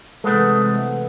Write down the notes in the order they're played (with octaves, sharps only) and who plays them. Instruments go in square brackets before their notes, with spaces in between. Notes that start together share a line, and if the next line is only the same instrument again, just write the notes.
[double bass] C3 E3 [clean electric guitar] G#3 A3 [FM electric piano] A4 B4 F#5